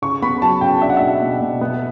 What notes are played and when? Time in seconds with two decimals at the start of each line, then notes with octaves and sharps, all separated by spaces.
0.02 C#3 C#6
0.22 B3 B5
0.42 F#3 A5
0.61 C#3 G5
0.82 D4 E5
0.90 F#5
0.97 B2 E5
1.22 B2
1.41 B2
1.61 B3